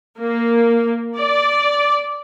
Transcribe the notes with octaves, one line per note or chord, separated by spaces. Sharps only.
A#3
D5